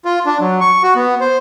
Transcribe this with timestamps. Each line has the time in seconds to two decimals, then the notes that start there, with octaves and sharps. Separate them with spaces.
0.05 F4
0.26 D4
0.40 F#3
0.61 C#6
0.83 F#4
0.96 B3
1.20 C5